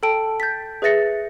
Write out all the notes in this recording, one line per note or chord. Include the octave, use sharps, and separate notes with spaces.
A4 G5 A5 D7
G6 A6 B6
G#4 B4 E5 A6 A#6 C#7